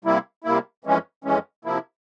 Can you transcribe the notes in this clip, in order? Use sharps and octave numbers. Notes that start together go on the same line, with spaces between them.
C3 G3 A#3 E4
C3 G3 A#3 E4
F2 E3 G#3 C#4
F2 E3 G#3 C#4
C3 F3 A#3 E4